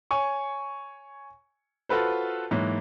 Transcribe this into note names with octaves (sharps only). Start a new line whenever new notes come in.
C#5 G#5 C#6
F4 F#4 A4 B4 C5
G#2 E3 F#3 A#3